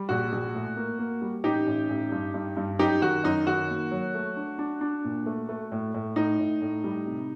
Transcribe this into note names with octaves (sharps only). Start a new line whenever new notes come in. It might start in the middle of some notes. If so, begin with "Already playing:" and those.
Already playing: G3
A#1 F#4
A#1
A2
A#3
A#3
G3
A1 D#4 G4
A1
A1
G2
G2
G2
F#2 D#4 G4
D#3 F#4
F#2 D#4
D#3 F#4
A#3
F#3
A3
D4
D4
D4
A#2
A3
A3
A2
A2
A2 D#4
A2
A2
G3
C3